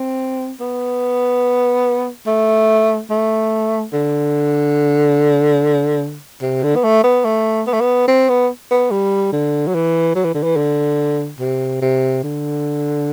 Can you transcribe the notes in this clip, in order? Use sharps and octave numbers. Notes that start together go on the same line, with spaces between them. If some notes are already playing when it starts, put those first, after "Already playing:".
Already playing: C4
B3
A3
A3
D3
C3
D3
B3
A3
B3
A3
B3
A3
B3
C4
B3
B3
G3
D3
F#3
E3
F#3
E3
D3
E3
D3
C3
C3
D3